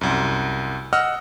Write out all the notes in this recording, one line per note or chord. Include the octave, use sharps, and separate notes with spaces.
C2 F#2
D#5 F#5 E6 F6